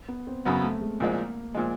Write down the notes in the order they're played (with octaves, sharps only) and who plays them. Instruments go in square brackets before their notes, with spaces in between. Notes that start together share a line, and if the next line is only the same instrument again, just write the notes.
[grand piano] B3
C4
[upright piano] F#2 C#3 F#3 B3
[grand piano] A3
G#3
[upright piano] C2 A#2 F3 G#3 [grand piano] A#3
[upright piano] A#2 F3 G#3